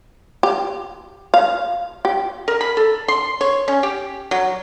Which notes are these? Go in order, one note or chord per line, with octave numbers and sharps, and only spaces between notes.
G4
F5
G4
A#4
B5
A4
C6
C#5
C#4
G4
F#3